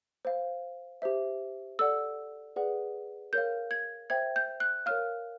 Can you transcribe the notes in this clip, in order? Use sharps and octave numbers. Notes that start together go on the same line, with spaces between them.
C5 F5
G4 C5 E5
A4 D5 F#5 E6
G#4 B4 D5 F#5
A#4 C#5 F5 G6
G#6
C5 E5 G5 G#6
G6
F#6
A#4 C#5 F5 F6